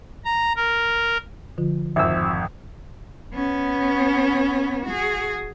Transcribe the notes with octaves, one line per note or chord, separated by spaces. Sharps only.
A#5
A#4
D3 F3 F4
G#1 F2 E5 E6
B3 C#4
F#4 G#4